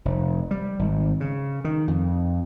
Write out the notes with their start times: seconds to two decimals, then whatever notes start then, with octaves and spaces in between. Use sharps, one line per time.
0.05 F1
0.51 G3
0.79 G#1
1.20 C#3
1.64 D#3
1.88 F2